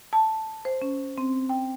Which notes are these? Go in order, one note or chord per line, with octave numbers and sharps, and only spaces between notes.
A5
C5
C#4
C4
G5